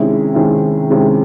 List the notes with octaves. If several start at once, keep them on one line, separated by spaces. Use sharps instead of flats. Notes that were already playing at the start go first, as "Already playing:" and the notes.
Already playing: C3 D#3 G#3 C#4 E4
C3 D#3 G#3 C#4 E4
C3 D#3 G#3 C#4 E4